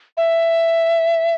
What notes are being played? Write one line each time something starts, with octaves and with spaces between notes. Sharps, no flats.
E5